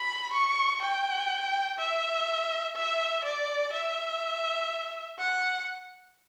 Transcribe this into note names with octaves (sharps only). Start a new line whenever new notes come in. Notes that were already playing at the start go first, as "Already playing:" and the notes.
Already playing: B5
C#6
G5
E5
E5
D5
E5
F#5